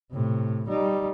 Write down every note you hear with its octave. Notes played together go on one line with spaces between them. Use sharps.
A2 C3
G3 D#4